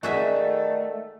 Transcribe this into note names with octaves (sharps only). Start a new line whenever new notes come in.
D#3 A3 F#4 G#4 D5 E5